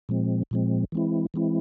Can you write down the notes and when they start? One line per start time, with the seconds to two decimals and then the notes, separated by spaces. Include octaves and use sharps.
0.09 A#2 F3 G#3 C4
0.51 A#2 F3 G#3 C4
0.92 E3 G#3 C4 E4
1.34 E3 G#3 C4 E4